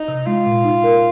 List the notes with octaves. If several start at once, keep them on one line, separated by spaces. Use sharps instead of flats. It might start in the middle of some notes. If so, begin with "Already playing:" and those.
Already playing: D#4
C3
G#3 F4
A#2
D#4
A#4